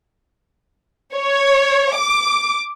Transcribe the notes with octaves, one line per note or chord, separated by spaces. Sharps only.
C#5
D6